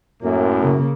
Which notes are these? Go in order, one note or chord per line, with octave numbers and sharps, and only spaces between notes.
F#2 A2 A#3
C#3 A#3